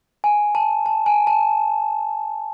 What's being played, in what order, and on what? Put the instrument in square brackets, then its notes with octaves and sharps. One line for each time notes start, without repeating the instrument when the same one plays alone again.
[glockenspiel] G#5
A5
A5
G#5
A5